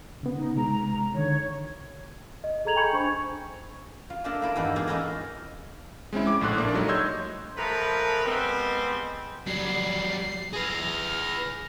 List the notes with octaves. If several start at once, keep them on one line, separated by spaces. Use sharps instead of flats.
C#3 B3
D#4
C3 G#3 A#5
D3 D#3 C#5
D#5
G#4 A4 A#5 G#6 F7 F#7
G5 G#5 B5 C#6 G6 C#7
D4 C5 C#6 G#6
F4
A3 A#3 D4 F4 A4 A#4
A#3 E4 D5
E2 G2 E3 D#4 G4 F#5
G#3 A#3 F4 G4 G#4
C#4 D#4 E4 A4 A#4
G#3 C4 C#4 E4
D6
A#1 A2 C6 F#6
A#3 D4 D5
F#3 G3 A3 D#4
C#5 D#5 C6 E6 G6 G#6
A#2 F3 A3 A#4 B4
G3 G#3 B3 C4
F#3 G3 C7
G#4 B4 F6 A#6